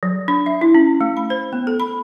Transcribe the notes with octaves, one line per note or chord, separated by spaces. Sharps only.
F#3
D4
E5
E4
C#4
A3
B5
C5
B3
A4
B5